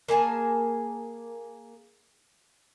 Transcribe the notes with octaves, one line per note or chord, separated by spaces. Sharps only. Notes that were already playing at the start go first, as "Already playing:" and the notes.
A#3 G#4 G#5 A5